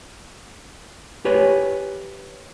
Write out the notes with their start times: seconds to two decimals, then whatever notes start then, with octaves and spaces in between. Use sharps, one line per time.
1.25 G4 B4 C#5 G#5